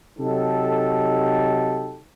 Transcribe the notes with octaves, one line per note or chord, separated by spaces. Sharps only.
C3 F#3 D#4 G4 A4